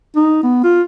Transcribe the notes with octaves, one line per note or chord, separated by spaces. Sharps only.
D#4
B3
F4